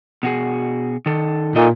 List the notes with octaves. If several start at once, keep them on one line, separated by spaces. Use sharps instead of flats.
B2 F#4 G#4
D#3 A4
A#2 D#4 A4 D#5